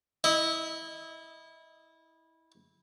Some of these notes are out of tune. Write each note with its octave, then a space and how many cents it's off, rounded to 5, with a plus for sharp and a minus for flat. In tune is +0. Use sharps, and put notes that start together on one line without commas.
E4 -20 D#5 +0